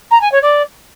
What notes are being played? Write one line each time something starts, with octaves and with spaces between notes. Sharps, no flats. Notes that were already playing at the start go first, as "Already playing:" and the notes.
A#5
G#5
C#5
D5